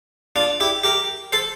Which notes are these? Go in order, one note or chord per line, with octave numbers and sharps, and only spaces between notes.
D4 F4
E4 G4
G4 A#4
A4 C5